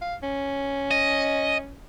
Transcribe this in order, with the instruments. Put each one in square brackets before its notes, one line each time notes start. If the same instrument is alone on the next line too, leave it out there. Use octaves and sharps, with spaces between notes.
[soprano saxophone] F5
C#4
[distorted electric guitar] D#5